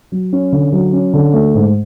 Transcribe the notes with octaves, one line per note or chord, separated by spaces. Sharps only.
F#3
C#4
D3
F#3
C#4
D3
A3
G#2